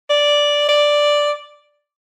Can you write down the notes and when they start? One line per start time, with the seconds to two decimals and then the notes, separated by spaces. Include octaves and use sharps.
0.10 D5
0.69 D5